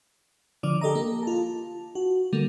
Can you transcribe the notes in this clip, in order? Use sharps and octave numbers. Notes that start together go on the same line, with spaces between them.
D3 F3 D5 D6
G4 A4 D#5 A#5
A#3
F4 A5
F#4
D3 G3 A3 A#3